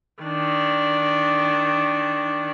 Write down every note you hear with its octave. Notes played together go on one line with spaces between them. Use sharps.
D#3 D4